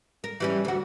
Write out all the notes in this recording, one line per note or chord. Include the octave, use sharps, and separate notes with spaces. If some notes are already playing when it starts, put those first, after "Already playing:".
A#4
E3 G3 C#4
D2 F#4